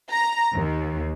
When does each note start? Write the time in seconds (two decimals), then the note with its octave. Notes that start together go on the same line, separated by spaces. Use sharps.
0.11 A#5
0.56 D#2